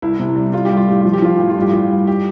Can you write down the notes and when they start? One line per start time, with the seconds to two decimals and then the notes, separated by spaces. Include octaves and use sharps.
0.02 C2 E4
0.19 C3
0.36 G3
0.53 G3 F4
0.65 G4
0.71 G3
0.77 F4
0.88 A2 G4
1.01 F3 F4
1.13 G4
1.22 F3 F4
1.37 A2 G4
1.49 F4
1.56 G2
1.62 G4
1.73 E3 F4
1.91 G3
2.07 G4